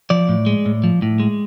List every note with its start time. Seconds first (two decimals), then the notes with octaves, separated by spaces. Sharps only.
0.10 F3 D5
0.29 A2
0.46 G#3
0.65 A2
0.84 F3
1.02 A2
1.20 G#3